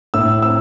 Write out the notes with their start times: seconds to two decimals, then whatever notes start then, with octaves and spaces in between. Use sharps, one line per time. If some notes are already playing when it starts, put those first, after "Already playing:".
0.14 A2 E6
0.42 C4 E6